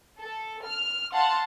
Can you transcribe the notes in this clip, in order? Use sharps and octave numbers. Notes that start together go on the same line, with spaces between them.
A4
F6
F5 F#5 A5 C6